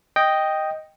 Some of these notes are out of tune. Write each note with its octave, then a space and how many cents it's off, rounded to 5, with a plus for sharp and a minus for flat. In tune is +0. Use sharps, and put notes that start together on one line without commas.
D#5 +0 G5 +0